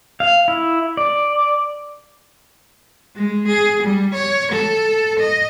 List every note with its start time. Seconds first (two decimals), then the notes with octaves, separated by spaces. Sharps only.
0.20 F5
0.48 E4
0.97 D5
3.16 G#3
3.48 G#4
3.83 G3
4.14 C#5
4.52 A4
5.19 D#5